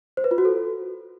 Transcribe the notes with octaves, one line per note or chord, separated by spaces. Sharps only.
C5
B4
F4
F#4
A4